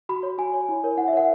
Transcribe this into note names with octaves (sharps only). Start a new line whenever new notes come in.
F#4 B5
C#5
F#4 G#5
C#5
E4
A#4 C#5
E4 F#5
E5
A#4 C#5 F#5